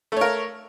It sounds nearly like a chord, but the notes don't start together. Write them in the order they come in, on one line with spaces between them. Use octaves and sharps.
A3 C#5 A#4